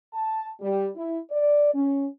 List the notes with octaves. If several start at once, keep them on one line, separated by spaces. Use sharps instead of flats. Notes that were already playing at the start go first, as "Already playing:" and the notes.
A5
G3
E4
D5
C#4